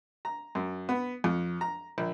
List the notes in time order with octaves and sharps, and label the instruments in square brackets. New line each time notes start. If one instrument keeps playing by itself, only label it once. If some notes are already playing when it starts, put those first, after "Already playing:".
[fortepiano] A#5
F#2
B3
F2
A#5
A#1